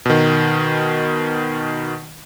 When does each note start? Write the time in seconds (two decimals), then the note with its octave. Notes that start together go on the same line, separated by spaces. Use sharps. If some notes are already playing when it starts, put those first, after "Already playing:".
0.06 B2 D#3